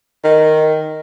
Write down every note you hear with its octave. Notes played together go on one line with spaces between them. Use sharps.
D#3